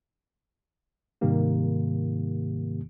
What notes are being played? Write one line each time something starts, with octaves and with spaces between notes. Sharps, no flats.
G#2 C3 D#3 G3 A#3 G4